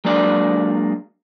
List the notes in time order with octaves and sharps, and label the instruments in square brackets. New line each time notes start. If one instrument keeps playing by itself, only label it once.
[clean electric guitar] F#3 G#3 A#3 D4 D5